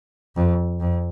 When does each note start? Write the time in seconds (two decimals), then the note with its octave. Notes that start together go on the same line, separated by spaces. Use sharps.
0.36 F2
0.80 F2